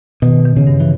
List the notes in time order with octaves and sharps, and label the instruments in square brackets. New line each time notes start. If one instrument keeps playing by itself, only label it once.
[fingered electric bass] B2 [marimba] D#3
[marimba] D#3
[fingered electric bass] C#3
[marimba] G2
[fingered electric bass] E3